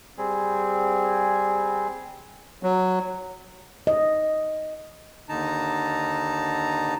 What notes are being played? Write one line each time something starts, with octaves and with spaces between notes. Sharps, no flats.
G3 C4 G#4
F#3
D#5
D#2 D3 D#4 A5 A#5